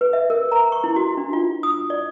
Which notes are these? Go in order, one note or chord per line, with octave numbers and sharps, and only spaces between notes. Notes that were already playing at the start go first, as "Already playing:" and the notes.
B4
E5
A#4
A#5
C#6
E4
F#4
D4
F4
D#6
D5